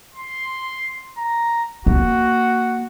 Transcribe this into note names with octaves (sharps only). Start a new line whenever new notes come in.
C6
A#5
A#3 F#4